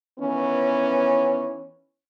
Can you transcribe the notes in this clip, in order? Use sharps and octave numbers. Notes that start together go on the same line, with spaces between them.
D#3 E3 B3 C#4